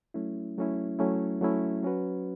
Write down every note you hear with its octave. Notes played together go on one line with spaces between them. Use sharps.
F#3 A3 C#4 E4
F#3 A3 C#4 E4
F#3 A3 C#4 E4
F#3 A3 C#4 E4
F#3 C#4 F#4 B4